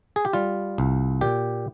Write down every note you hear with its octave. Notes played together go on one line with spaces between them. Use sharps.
G#4
G4
G3 F4
C2
A#2 G4